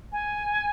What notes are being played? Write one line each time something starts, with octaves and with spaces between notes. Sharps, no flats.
G#5